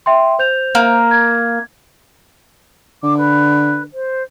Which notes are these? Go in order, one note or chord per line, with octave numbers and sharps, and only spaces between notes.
E5 G5 C6
C5 G6 F7
A#3
G#6
D3 D6
B4
C5